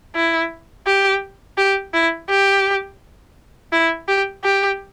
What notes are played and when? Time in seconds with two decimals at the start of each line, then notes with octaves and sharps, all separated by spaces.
0.15 E4
0.86 G4
1.58 G4
1.94 E4
2.30 G4
3.72 E4
4.08 G4
4.44 G4